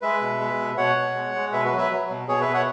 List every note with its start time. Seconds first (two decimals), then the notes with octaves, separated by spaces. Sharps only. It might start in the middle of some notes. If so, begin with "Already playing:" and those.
0.02 G#3 B4 E5
0.21 B2
0.41 G#3
0.59 B2
0.77 B2 C#5 F#5
0.96 B2
1.15 G#3
1.35 G#3
1.52 B2 B4 E5
1.65 F#4 B4
1.72 F#3
1.78 B4 E5
1.91 F#3
2.09 B2
2.28 B2 G#4 C#5
2.41 B4 E5
2.48 B2
2.53 C#5 F#5